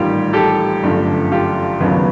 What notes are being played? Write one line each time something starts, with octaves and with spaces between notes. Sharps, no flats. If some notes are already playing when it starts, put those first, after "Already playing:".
Already playing: A1 G#2 D#3 G3 A#3 F4 G4
G4 A4
G1 F#2 D3 F3 A3
F4 G4
F1 D#2 C#3 F#3 B3